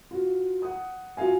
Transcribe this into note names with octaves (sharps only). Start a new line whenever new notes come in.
F4 F#4
F#5 D#6
F4 F#4 E5 F5 G#5